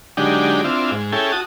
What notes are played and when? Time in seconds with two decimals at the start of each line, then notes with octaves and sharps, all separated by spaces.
0.17 D3 F#3 G#3 D4 D#4 G4
0.64 C4 D4 E4 F4
0.91 G#2
1.12 C#4 E4 G#4 A4 G5
1.32 F#4 A5 D#6